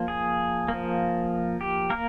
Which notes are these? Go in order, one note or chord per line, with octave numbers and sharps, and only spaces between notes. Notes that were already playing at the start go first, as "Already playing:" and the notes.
Already playing: F3 A#3
G#4
A#3
F3
G4
A#3 A#4